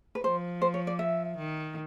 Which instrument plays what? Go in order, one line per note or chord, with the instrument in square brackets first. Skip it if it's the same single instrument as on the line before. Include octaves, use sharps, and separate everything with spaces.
[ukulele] B4
[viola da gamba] F3 [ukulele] C5
[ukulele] C5
C#5
D5
E5
[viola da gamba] D#3